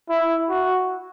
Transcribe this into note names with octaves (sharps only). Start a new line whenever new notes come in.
E4
F#4